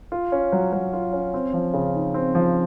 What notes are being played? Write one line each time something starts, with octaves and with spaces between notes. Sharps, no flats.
F4
C#4
F#3
F#3
F4
C#4
C4
F3
C#3
D#4
C4
F3